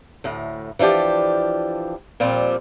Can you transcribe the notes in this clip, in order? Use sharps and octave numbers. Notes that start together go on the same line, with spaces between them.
D2 A2
E3 F3 D4 G4
A#2 F3 G3 C4